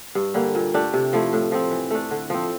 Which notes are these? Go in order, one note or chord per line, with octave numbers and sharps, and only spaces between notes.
G2
D3 G3 A#3
A#2
A3 D4 G4
C3
F3 A3 E4
A2
F3 C4
E3
A3 D4
D3
F3 C4